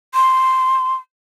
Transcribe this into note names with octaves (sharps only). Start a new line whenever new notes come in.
C6